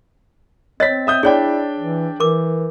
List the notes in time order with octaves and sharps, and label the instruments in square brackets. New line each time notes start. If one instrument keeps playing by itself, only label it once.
[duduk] C4 [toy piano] C#5 D#5 [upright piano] A6 B6
[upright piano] E5 D#6 G6
[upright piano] D4 G5 [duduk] E4 [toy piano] G#4 C#5 D5
[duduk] E3
[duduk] E3 [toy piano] A#4 D6